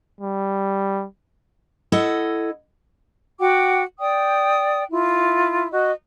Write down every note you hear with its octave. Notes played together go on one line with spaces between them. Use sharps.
G3
E4 A4 D#5 F#5
F#4 F#5 G5 D6
D5 G5 D#6
E4 F4
F#4 D#5